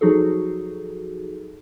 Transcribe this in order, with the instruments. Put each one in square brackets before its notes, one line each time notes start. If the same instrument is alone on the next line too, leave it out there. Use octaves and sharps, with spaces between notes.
[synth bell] F3 F#3 D#4 F#4 G#4 A4